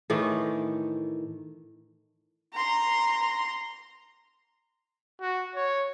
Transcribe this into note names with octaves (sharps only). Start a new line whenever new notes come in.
A2 D#3 E3 A3
A#5 C6
F#4
C#5